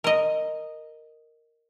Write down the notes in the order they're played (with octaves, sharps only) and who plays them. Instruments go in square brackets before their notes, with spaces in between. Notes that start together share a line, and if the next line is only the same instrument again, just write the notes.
[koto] A#4 D#5